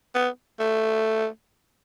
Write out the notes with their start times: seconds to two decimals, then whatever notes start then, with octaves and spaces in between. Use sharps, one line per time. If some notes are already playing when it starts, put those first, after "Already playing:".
0.15 B3
0.60 A3